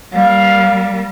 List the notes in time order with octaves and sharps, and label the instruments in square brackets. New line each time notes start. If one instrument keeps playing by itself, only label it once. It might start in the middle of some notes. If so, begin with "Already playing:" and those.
[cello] G3 A#3 [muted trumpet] F5